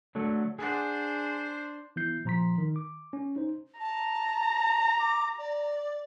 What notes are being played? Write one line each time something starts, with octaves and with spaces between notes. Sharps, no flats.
D3 F#3 A3
D4 G#4 C5 F#5
E3 B3 E4 G6 C7
A#2 F3 A#5 C6 B6
D#3
D6
C#4
D#4 C5
A5 A#5
D6
D5